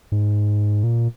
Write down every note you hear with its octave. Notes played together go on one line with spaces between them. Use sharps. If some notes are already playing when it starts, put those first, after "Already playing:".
G#2
A#2